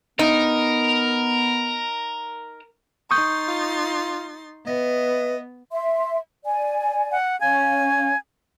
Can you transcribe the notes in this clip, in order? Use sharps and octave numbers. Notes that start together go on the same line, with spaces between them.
B3 D#4 A#4
D#4 C6 C#6 D#6 G6 A6
F4
B3 B4 D#5 E5
E5 C6
D5 G#5
F#5
C#4 F5 G#5